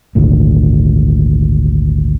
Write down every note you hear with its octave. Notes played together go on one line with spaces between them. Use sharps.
G#1 D2 A#2